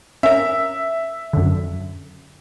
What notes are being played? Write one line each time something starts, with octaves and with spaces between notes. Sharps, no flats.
C#4 A#4 E5
F#2 D3